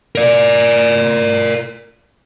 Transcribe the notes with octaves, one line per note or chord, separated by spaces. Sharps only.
A#4 D5